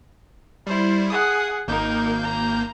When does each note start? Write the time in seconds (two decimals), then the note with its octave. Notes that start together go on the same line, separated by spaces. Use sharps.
0.67 G3 E4 C5
1.10 G#4 F#5 D#6
1.68 G#1 A#3 D#4 A#4 G6
2.23 A#5